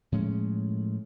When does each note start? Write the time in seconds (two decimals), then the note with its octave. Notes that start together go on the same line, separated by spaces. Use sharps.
0.12 A2 F3 G#3 C#4